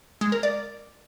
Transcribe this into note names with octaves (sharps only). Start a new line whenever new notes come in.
G#3
A#4
D5